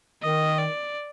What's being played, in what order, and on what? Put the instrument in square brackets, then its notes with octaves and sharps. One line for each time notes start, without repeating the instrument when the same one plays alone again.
[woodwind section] D#3 [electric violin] D#5
[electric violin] D5